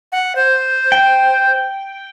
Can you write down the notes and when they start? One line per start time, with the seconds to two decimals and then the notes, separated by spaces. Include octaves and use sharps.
0.12 F#5
0.35 C5
0.92 G5